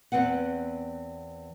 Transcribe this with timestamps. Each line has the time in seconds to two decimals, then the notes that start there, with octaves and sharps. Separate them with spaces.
0.12 E2 B3 C4 B4 F#5